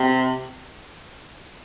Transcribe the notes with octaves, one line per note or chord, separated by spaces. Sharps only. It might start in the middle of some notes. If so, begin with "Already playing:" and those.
Already playing: C3